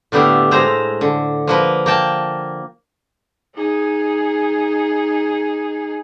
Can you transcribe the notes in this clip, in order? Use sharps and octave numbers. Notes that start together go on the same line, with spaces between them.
A2 D3 B3 G4 E5 F5
A2 G#3 C5 A#5
D3
F3 A#3 B4
A#3 G5 A5
D#4 G#4